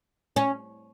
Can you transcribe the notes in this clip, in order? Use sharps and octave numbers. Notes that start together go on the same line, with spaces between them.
C#4